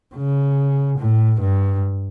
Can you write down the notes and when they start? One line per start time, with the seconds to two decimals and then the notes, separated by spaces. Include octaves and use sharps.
0.15 C#3
0.99 A2
1.41 G2